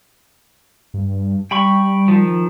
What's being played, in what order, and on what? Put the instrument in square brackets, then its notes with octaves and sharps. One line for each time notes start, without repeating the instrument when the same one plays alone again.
[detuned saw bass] G2
[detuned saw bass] G3 [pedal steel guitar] G5 B5 C#6
[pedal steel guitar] D#3 F3